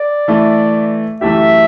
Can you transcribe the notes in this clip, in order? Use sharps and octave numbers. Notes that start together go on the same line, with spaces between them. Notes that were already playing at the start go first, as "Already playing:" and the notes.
Already playing: D5
E3 A3 E4
F#2 E3 A3 E4 G4 E5